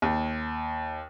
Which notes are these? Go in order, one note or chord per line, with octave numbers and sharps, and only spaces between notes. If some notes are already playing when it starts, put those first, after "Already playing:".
D#2